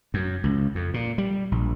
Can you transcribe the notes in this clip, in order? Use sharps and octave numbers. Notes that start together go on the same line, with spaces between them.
F#2
C#2
F2
A#2
G3
A#1